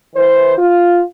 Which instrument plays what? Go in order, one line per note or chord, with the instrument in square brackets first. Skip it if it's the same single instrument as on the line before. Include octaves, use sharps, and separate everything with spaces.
[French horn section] E3 C5
F4